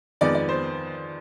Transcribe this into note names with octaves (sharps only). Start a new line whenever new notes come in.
F2 D#3 G#3 B3 D5
D5
C5